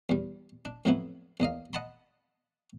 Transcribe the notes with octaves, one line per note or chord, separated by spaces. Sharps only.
E2 G3
D4
F2 A2 F3 F#3 B3 E4
E2 A#3 D#5 F5
D#5 F#5 A5 B5 C6